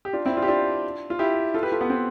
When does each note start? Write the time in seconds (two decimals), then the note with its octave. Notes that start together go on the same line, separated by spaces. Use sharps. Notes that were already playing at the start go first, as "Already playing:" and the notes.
0.05 G4
0.13 D4 F4
0.25 C4 E4
0.37 D4 F4
0.42 G4
0.48 D4 F4
1.10 F4
1.19 E4 G4
1.54 F4 A4
1.63 G4 B4
1.72 F4 A4
1.81 B3
1.90 C4